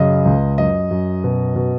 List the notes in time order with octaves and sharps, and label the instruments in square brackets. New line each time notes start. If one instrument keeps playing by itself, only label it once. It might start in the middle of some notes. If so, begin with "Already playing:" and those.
Already playing: [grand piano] F#2 C#3 D#5
C#2
F#2 D#5
F#2
B2
B2